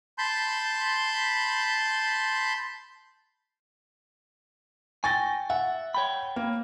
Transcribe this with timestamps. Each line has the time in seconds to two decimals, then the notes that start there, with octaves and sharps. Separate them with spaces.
0.18 A5 B5 C6 G6
5.04 G5 G#5 C#6 A6 A#6
5.50 E5 F#5
5.95 C#5 G5 B5
6.36 A#3